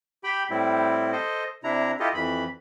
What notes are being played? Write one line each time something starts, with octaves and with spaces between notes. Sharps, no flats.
G4 G5 B5
A2 G3 C4 E4
A4 C5 D#5
C3 D4 E4 A#5
E4 F4 G4 A4 D#5
F2 E3 B5